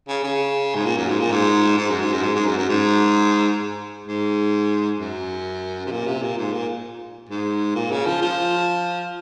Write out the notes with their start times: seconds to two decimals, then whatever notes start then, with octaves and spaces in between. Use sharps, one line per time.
0.09 C#3
0.24 C#3
0.76 G#2
0.85 A#2
0.98 F#2
1.09 G#2
1.20 A#2
1.32 G#2
1.78 G#2
1.90 F#2
2.01 G#2
2.12 F#2
2.23 G#2
2.35 G#2
2.47 F#2
2.58 F#2
2.69 G#2
4.08 G#2
5.00 F#2
5.86 C3
5.92 A#2
6.07 C3
6.22 A#2
6.38 G#2
6.53 A#2
7.29 G#2
7.75 A#2
7.92 C#3
8.07 F3
8.22 F3